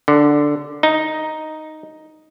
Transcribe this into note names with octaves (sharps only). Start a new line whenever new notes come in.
D3
D#4